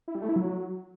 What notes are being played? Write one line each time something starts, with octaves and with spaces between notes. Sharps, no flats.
E4
G3
A3
E4
F#3